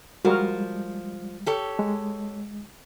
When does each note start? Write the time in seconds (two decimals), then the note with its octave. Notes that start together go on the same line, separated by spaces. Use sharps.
0.25 F3 G3 G#3 F#4 A#4
1.46 G4 A4 C#5
1.79 G#3